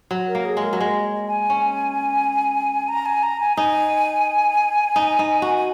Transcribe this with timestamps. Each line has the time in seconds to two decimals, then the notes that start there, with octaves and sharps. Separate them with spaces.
0.11 F#3
0.28 A#4
0.35 A#3
0.45 G#4
0.57 G#3
0.63 A#4
0.73 F#3
0.80 G#3 D#5
1.27 G#5
1.50 C#4
2.88 A#5
3.06 G#5
3.23 A#5
3.40 G#5
3.57 D#4 G#5
4.96 D#4
5.19 D#4
5.42 F#4
5.58 G#5